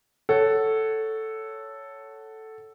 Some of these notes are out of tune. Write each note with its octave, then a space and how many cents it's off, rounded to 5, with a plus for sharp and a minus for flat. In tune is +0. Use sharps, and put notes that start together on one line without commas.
A4 +0 C#5 +5 F#5 +15